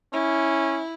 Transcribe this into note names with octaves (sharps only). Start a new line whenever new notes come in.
C#4 E4